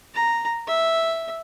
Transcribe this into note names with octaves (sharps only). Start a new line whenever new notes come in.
A#5
E5